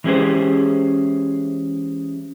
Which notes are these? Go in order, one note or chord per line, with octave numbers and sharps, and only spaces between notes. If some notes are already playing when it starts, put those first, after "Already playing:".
E3 G#3 C#4 G4 G#4 C5